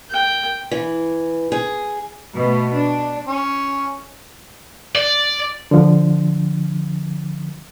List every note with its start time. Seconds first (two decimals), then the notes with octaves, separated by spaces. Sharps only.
0.11 G5
0.71 E3
1.52 G#4
2.34 B2 A3
2.73 D4
3.27 C#4
4.96 D5
5.71 D3 F3